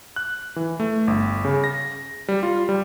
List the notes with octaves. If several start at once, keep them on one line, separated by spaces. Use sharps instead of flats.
F#6
E3
A3
G1
C#3
A#6
G3
F4
G3